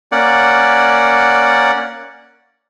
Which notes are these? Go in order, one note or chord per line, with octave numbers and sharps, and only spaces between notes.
A#3 C#4 D5 F#5